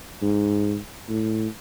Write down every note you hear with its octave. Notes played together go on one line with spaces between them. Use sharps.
G#2
A2